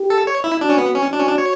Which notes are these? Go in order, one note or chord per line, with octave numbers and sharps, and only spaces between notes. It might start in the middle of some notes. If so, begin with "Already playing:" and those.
Already playing: G4
A4
C#5
E4
D4 F#4
C#4
B3
C#4
D4 F#4
C#4
D4
C#5